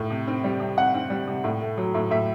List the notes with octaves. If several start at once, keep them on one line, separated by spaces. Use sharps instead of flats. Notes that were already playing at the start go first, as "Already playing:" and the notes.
Already playing: A2
C3
C4
G3
C3
C3 F#5
C4
G3
C3
A2
A3
F#3
A2
A2 E5